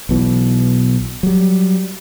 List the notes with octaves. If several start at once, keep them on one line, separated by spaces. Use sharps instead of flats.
B1 B2 E3
F#3 G3